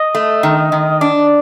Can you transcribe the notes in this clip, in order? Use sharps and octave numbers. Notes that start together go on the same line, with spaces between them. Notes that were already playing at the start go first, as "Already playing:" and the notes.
Already playing: D#5
A3
D#3
D#3
D4 D5